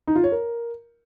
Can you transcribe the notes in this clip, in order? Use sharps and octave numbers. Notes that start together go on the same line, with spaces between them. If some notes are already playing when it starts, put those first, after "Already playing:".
D#4
F4
C#5
A#4